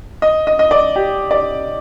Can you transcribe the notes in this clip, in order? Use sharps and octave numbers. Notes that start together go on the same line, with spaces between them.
D#5
D#5
D#5
D5
G4
D5